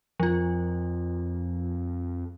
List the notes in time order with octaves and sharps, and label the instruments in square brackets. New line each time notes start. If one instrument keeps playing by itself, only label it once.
[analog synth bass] F2 [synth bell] F3 F4